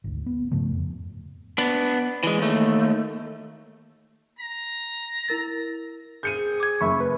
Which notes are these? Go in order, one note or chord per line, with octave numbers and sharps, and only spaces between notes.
G#1 D2
B3
G#2 C#3 F3 A3
F2
B3 D4
E3 G#3
D#2 A3
A#5
E4 A#4 A6
C4 G#4 G6 C#7 D#7
D6 G#6
F#1 E5 B5 C#6
B4